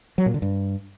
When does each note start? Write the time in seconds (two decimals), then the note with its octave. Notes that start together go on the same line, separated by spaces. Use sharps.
0.18 F#3
0.26 A#2
0.34 D3
0.42 G2